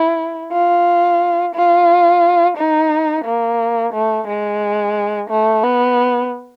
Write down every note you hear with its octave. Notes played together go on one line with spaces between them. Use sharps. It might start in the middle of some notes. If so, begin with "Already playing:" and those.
Already playing: E4
F4
F4
D#4
A#3
A3
G#3
A3
B3